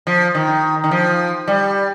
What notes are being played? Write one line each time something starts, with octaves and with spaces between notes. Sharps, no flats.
F3
D#3
D#3
F3
G3